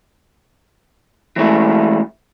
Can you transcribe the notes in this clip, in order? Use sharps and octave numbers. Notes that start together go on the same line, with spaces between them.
E3 G#3 A3 E4